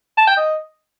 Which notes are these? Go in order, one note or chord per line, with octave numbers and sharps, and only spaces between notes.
A5
G5
D#5